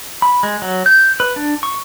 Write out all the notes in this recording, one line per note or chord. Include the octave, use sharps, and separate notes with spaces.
B5
G#3
F#3
G6
B4
D4
C#6